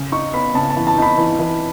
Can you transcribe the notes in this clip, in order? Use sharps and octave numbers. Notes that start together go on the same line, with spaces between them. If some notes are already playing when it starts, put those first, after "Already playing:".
Already playing: C#3
D#4 C#6
B3 B5
C#3 A5
A5
E3
A5
D#4 B5
E3
E3